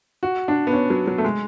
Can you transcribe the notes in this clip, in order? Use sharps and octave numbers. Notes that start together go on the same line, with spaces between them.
F#4
D4
B3
C#4
F#3
F#3
A3
G#3